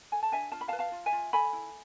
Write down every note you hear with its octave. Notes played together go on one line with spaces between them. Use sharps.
A4 G#5
A5
D4 E5 G#5
F4 A5
B5
F5 A5
B4
F5 A5
F4
E5 G#5
F4
A4 G#5 B5
E4